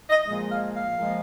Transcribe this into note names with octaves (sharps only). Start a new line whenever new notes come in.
D#5
A#2 F3 G#3
F5
F5
A#2 F3 G#3